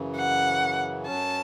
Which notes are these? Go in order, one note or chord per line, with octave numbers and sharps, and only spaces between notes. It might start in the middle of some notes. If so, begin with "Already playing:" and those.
Already playing: F#2 C#3 E3
F#5
F#2 F#3 C#4 A5